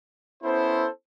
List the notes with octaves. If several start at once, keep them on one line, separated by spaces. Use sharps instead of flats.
B3 C#4 E4 A4 C5